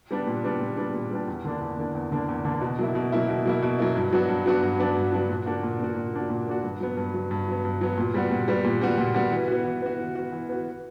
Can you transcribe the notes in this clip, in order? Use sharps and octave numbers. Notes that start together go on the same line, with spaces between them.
G3 B3 D4
A#2
G3 B3 D4
A#2
G3 B3 D4
A#2
G3 B3 D4
E2
D3 A#3 D4
E2
D3 A#3 D4
E2
D3 A#3 D4
E2
D3 A#3 D4
B2
F#3 A#3 E4
B2
F#3 A#3 E4
B2
F#3 A#3 E4
B2
F#3 A#3 E4
G2
F#3 B3 D4 F#4
G2
F#3 B3 D4 F#4
G2
F#3 B3 D4 F#4
G2
F#3 B3 D4 F#4
A#2
A#3 D4 F#4
A#2
A#3 D4 F#4
A#2
A#3 D4 F#4
A#2
A#3 D4 F#4
G2
F#3 B3
G2
F#3 B3
G2
F#3 B3
G2
F#3 B3
A#2
G3 B3 F#4
A#2
G3 B3 F#4
A#2
G3 B3 F#4
A#2
G3 B3 F#4
E3
B3 F#4
E3
B3 F#4
E3
B3 F#4
E3
B3 F#4